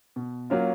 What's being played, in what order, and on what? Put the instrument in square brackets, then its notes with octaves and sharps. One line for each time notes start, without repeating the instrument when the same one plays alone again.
[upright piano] B2
F#3 A#3 C#4 F4